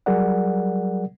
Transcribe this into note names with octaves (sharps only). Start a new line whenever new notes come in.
F#3 G3 G#4 A#4 D5 F#5